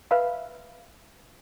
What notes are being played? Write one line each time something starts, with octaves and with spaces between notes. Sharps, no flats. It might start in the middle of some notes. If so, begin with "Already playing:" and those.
B4 E5 F5 B5